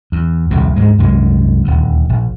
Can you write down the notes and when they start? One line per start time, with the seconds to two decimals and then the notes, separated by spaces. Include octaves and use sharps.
0.12 E2
0.51 D#1 C2 F2 C3
0.76 D2 G#2 G#3
0.98 C2 F#2 G#3
1.64 D#1 D2
2.09 A#1